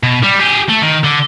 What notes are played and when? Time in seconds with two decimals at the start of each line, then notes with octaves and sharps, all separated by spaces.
0.03 B2
0.23 G3
0.40 G4 G#4
0.69 A3
0.83 D#3
1.04 D3